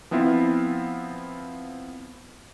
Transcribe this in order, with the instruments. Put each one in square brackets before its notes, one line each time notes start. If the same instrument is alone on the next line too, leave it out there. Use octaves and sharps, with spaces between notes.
[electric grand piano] F3 B3 C4 E4 F4